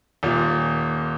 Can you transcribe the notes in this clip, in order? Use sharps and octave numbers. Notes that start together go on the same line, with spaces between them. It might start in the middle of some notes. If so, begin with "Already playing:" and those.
D#1 A#2